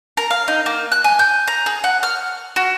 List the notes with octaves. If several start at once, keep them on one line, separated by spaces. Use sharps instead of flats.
A#4
F5
D#4
A#3
F#6
G#5
G6
A#5
G#4
F#5
F6
F#4